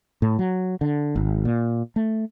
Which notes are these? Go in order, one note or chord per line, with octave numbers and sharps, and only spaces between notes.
A2
F#3
D3
G#1
A#2
A3